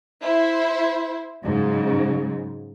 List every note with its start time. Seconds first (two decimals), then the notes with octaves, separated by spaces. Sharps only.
0.22 E4 C5
1.42 G#2 C#3 F#3